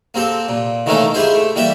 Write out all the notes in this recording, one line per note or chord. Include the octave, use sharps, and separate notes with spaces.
A#3 C4 G4 A4
A#2
D#3 E3 A3 A#3 C#4 D#4
E4 F4 G4 G#4 C5
A3
E3 G3 A#3 G4 D5 E5